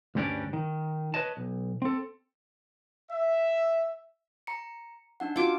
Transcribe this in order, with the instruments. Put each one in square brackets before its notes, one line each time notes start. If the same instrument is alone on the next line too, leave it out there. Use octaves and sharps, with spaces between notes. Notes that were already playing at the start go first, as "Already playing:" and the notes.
[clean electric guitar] D2 G2 G3 C#4 D4 D5
D#3
B4 C#5 D#5 A5
B1
C4 A4
[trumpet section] E5
[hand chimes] A#5 C#7
D4 D#4 F#5
[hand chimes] D#4 F#4 [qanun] F4 D6